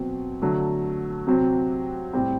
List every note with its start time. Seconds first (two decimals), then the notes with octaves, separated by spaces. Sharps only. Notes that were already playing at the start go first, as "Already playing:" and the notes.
Already playing: B2 F#3 C4
0.42 D3 F#3 A3
1.27 C3 F#3 C4 F#4
2.13 A2 G3 C4